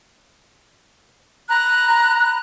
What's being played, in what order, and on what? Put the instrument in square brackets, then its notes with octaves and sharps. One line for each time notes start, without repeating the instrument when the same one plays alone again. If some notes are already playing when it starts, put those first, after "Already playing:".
[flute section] A#5 B5 F#6